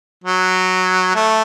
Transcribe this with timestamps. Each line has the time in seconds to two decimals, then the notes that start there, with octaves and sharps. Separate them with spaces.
0.24 F#3
1.16 A3